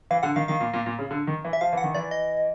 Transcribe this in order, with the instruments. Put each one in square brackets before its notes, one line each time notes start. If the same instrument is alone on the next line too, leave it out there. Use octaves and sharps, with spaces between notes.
[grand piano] E3 [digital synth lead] F5
[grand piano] D3 [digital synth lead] F#5
[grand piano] D#3 [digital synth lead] F5
[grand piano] D#3 [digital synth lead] F5
[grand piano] A#2
A#2
A#2
C#3
D3
D#3
E3
[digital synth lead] E5
[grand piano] F3 [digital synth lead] F5
[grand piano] E3 [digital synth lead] F#5
[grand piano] D#3
[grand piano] E3 [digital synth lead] D5
[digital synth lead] D#5